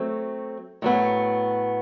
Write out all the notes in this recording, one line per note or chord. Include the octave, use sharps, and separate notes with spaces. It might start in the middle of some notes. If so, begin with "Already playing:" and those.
Already playing: F#3 A3 C4
A2 F#3 B3